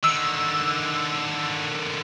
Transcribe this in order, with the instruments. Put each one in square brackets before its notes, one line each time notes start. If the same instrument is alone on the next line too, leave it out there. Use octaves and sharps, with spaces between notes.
[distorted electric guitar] D3 D#3 [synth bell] E6